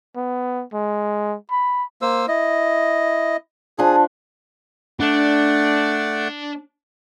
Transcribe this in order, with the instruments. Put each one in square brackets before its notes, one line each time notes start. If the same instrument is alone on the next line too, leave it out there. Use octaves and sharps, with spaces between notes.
[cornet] B3
G#3
B5
[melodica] A#3 C5 E6
E4 D#5
[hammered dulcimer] F3 D4 [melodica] G#4
[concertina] A3 D5 F#5 [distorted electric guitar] D4